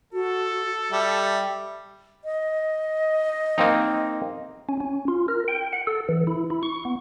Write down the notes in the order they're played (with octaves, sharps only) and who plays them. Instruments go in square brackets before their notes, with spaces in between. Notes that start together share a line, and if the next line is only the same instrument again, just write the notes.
[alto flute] F#4 [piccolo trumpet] A4
[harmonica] G3 [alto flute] E5
[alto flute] D#5
[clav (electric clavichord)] A#3 C4 D#4
[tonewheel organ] C#4
C#4
F4
A#4
G5
F#5
A4
E3
E4
E4
C#6
B3